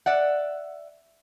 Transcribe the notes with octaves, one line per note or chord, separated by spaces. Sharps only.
D5 E5 F#5